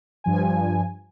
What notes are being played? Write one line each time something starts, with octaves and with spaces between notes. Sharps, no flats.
G2 F3 G#5